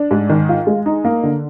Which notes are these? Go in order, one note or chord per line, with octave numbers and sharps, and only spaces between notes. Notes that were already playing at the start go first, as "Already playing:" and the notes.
Already playing: D4
G#2
D#3
F4
G#3
D#4
A#3
D3